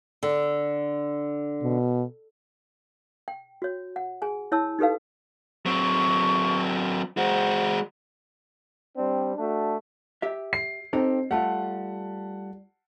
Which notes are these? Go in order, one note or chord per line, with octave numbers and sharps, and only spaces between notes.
D3
B2
G5
F#4 C#5
F#5
G#4 G#5
E4 C#5 A5 E6
D#4 G4 A4 B4 F5
F#3 C4 C#6
G#3 F#4 C5
G3 C4 D4
A3 D4 F#4
G4 E5
C7
C4 D#4 G4 A4
G3 A3 F4 F#5 A5